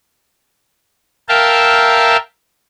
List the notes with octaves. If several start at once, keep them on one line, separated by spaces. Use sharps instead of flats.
A#4 E5 F5 G5 A5